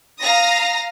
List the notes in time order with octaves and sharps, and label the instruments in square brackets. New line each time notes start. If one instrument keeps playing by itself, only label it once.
[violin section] F5 A#5 D#6 A#6